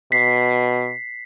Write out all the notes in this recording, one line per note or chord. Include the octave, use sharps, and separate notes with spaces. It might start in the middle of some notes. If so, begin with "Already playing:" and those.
B2 B6 C7